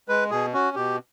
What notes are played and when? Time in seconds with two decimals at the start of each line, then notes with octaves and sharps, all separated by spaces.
0.09 G#3 B4
0.31 B2 G#4
0.53 C#4 F#4
0.75 B2 G4